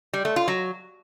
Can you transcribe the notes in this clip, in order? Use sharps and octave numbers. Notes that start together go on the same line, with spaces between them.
G3
A3
F4
F#3